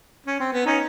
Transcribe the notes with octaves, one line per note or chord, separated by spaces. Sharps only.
C#4
C4
B3
C#4 D#4